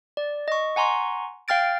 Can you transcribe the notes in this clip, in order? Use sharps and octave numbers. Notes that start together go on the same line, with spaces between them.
D5
D#5 C#6
F#5 G#5 A#5 C6 C#6
F5 G5 F6 A6 D7